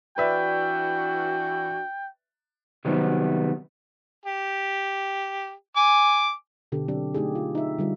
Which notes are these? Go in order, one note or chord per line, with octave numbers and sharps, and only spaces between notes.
E3 D4 F#4 B4 D5 E5 G5
C3 D#3 F#3 G3 B3 C4
G4
G#5 D6
B2 D3 G4 A4
F#3 C4 D4 G4
A3 D#4 G4 G#4
F4
D#4 E5
D3 G3 F4